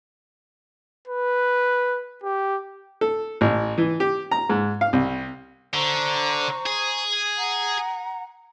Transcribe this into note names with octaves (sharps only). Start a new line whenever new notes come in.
B4
G4
A4
A1
E3
G4
A#5
G#2
F5
C2
D3 C5 A#5 C#6
G#4
F#5 A#5